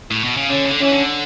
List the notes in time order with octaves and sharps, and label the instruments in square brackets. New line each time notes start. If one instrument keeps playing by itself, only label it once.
[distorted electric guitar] A2
B2
C#3
[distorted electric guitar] D3 [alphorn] C#4
[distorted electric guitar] C#3
D3
[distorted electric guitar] E3 [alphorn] C#4
[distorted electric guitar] D3